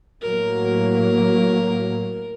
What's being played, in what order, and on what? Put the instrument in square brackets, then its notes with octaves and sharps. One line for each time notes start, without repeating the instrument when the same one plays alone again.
[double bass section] A2 F#3 A#3 [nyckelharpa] A#4